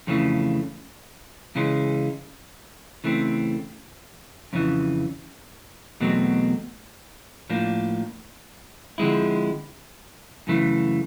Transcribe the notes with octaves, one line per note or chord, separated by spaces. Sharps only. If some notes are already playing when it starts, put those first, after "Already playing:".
F2 C#3 E3 A3
C#3 E3 G#3 C#4
C#3 E3 A3 C4
F2 C#3 E3
E2 B2 F#3 A3 C4
A2 F3 A#3 D4
D3 F3 G#3 C4 E4
F#2 C#3 E3 A3